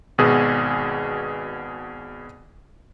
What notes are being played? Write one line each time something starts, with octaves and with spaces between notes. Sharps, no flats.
G#1 B2 F#4 G#4